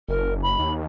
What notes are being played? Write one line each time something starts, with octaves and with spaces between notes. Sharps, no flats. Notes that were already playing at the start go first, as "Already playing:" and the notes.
F#1 A#4
B5
D#2